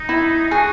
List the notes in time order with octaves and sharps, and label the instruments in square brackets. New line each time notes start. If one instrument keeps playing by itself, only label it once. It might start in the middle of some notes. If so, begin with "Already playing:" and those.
Already playing: [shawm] D#4
[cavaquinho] E4
[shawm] F#4 [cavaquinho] G#4